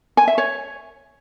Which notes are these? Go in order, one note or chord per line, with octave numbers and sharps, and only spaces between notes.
G#5
E5
C#5